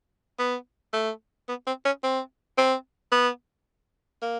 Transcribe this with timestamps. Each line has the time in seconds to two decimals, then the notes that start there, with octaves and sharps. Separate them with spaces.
0.39 B3
0.93 A3
1.48 B3
1.67 C4
1.85 C#4
2.03 C4
2.58 C4
3.12 B3
4.22 A#3